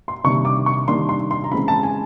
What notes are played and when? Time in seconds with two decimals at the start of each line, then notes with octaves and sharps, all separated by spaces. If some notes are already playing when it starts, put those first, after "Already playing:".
0.08 C6
0.24 C3 D#3 G3 A#3 D4 C#6
0.45 D6
0.66 C#6
0.87 C3 D#3 G3 A#3 D4 C6
1.09 C6
1.31 C6
1.44 A#5
1.51 C#3 E3 G#3 C4 B5
1.68 A5
1.83 G#5